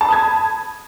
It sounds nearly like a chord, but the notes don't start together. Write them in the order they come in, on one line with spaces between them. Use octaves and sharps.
A5 B5 D#6 G#6